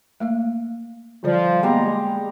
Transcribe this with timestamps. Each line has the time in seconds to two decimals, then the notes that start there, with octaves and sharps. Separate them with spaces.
0.20 A3 A#3 F5
1.24 D3 F3 G3 D5
1.63 G3 G#3 A#3 B3 A#5 C6